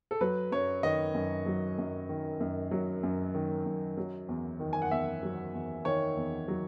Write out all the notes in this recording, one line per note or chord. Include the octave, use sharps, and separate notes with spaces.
A4
F#3 B4
F#2 C#5
D#3 D#5
F#2
F#3
F#2
D#3
F#2
F#3
F#2
D#3
F#2
F#3
E2
D#3
G#5
F#5
E2 E5
F#3
E2
D#3 C#5
E2
F#3